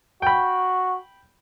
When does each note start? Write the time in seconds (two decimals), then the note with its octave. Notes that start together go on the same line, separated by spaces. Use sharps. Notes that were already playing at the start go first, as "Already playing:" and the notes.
0.22 F#4 G5 B5